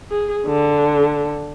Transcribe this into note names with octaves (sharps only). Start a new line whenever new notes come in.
G#4
D3